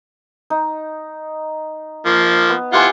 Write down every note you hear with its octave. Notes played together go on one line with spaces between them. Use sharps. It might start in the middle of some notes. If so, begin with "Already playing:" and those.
D#4
F3 A#3
B3
E4 F4 G4 C5 F#5 G#5